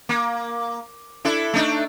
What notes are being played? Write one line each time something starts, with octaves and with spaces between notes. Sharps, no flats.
A#3
D4 E4 A4
A3 D4 D#4